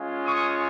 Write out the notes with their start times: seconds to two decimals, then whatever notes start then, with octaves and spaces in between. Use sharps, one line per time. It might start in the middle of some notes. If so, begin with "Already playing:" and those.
Already playing: G#3 C#4 F4
0.25 C#6 D#6